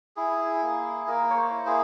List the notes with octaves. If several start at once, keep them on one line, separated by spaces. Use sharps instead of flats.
E4 G#4
A#3
A#3 A#4
C#5
C5
E4
G#4